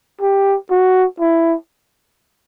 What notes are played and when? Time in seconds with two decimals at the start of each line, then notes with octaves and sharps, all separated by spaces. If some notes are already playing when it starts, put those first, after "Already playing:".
0.21 G4
0.70 F#4
1.20 E4